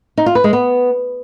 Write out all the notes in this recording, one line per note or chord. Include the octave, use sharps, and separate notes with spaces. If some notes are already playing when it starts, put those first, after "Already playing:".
D#4
F4
B4
G#3
B3